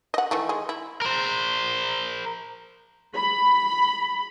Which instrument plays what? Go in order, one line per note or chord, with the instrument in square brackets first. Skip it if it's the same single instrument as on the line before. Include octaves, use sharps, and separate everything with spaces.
[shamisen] D#5 F#5
D#3 E3 A3
G#3
E4
[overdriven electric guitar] A#4 C5
[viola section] B5